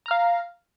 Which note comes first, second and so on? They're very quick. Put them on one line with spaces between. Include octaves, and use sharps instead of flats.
A#5 F6 F5